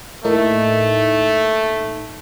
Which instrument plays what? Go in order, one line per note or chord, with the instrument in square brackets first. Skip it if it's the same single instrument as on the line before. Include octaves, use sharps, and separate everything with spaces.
[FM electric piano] A2 A#3 D#4 [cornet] A3